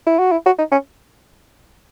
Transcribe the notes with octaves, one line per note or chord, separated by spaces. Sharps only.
E4
F#4
E4
F#4
D#4
C#4